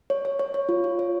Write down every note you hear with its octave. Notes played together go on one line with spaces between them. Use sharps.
C#5
C#5
C#5
C#5
F4
F4
C#5